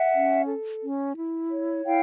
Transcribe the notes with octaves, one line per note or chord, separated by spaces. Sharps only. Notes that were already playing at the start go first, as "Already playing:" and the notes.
Already playing: E5 F#5
C#4
A4
C#4
E4
C#5
E4 F5 G5